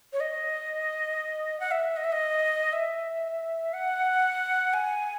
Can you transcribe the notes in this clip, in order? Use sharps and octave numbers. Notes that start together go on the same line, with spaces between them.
C#5
D#5
F#5
E5
D#5
E5
D#5
E5
F#5
G#5